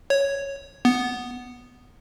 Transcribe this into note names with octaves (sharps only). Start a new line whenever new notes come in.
C#5
B3